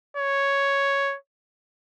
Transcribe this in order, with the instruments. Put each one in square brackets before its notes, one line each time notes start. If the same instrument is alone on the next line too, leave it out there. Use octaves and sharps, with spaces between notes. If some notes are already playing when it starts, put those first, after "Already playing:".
[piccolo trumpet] C#5